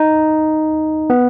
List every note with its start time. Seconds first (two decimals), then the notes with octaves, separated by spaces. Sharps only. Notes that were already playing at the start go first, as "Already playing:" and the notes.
Already playing: D#4
1.10 B3